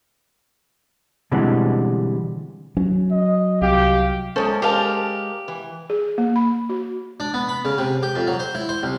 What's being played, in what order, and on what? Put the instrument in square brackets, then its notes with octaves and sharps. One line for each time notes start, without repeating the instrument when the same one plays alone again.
[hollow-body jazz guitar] B2 D3 E3 G3 G#3 C4
[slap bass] F#3 [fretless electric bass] C#4
[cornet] D#5
[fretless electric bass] C2 [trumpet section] G4 [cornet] F5
[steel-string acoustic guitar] E2 G#3 C#4 [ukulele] A4 C5
[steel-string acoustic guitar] G#3 A#4 D5 [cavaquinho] G4 F5 A5
[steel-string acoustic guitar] E3
[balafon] G#4
A#3
B5
F#4
[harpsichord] D4
B3
B5
C#3
C3
G4
F2
F#3
C5
E4
C5
C2